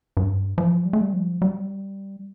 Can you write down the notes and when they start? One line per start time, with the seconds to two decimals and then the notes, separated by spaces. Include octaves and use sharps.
0.17 G2
0.58 F3
0.85 G3
0.93 A3
1.01 G3
1.13 F3
1.42 G3